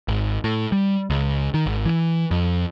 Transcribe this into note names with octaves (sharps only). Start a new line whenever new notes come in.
G#1
A2
G3
C#2
D#3
G#1
E3
F2